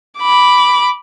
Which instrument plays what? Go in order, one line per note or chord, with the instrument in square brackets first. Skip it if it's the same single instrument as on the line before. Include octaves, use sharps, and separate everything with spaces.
[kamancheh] B5 D6